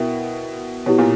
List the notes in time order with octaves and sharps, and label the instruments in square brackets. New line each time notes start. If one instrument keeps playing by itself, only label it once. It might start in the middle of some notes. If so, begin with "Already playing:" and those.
Already playing: [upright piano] B2 [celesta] E4 A#4 E5 G5
[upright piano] B2 [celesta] E4 G4 C#5
[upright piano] A#2